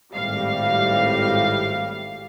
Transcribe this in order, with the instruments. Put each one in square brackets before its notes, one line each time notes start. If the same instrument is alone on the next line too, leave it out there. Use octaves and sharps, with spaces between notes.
[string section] G#1 A2 G3 F5